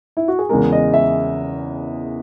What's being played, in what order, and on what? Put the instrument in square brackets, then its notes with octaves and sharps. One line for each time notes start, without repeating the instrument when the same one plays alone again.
[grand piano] E4
F#4
G#4
E2 C#3 G#3 A#4
D#5
E5